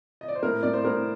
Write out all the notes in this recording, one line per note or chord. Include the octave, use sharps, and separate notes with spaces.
D#5
D5
C5
A2 A#4
A2 D5
C5
A2 A#4